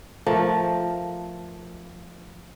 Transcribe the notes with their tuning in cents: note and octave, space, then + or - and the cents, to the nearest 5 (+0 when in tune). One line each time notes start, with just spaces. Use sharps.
F3 +0 A3 +0 A#4 +0